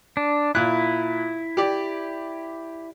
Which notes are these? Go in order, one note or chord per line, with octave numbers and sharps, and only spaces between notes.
D4
A#2 E4 F#6
G4 D5